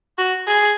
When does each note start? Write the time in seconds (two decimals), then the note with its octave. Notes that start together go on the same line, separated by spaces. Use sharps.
0.18 F#4
0.47 G#4